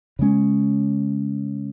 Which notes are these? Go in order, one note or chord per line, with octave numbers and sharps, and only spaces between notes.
C#3 G#3 C#4